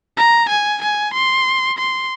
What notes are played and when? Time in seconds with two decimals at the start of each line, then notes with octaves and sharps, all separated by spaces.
0.17 A#5
0.49 G#5
0.82 G#5
1.14 C6
1.78 C6